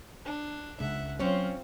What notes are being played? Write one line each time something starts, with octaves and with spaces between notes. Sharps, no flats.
D4
C#2 C#3 E5 F#5
F#3 C4 C#4 F4 C#5